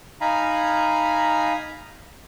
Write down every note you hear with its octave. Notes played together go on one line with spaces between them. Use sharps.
D#4 F5 G#5 A#5 B5